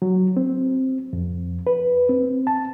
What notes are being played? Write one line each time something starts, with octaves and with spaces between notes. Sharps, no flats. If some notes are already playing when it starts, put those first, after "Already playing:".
F#3
C4
F2
B4
C4
A5